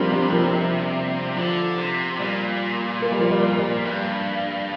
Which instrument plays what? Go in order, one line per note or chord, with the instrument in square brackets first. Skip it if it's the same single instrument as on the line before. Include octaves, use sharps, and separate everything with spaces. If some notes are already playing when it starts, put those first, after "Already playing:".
Already playing: [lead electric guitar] C3 [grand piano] F3 G3 A#3 C4 D4
[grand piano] G3 C4
F3 A#3
F3
G3
[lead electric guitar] D3 [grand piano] F3
[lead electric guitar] C3
[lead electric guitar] A#2 [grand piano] G3
[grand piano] A#3
G3
F3 A#3
G3
G3
[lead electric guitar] G2